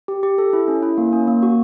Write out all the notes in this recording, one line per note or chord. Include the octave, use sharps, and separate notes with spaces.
G4
G4
A4
E4
C#4
E4
A#3
C#4
A#3
F#4